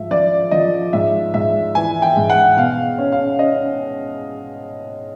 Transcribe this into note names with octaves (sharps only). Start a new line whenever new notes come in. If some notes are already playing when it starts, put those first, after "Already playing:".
Already playing: G#2 F3 E5
F3 D5
F3 D#5
G#2 E5
G#2 E5
E3 G#5
G5
G#2
F#5
B2 F5
C#4
F5
C#4 D#5